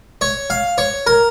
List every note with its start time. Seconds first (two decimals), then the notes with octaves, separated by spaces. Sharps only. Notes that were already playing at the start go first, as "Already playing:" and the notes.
0.21 C#5
0.50 F5
0.78 C#5
1.07 A#4